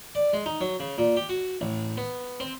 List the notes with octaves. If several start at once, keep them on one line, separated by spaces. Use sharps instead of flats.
D5
G#3
D#4
F#3
C#3
A#2
G4
F#4
A1
B3
C4